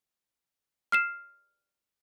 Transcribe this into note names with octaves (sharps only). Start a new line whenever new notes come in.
F6 C7 E7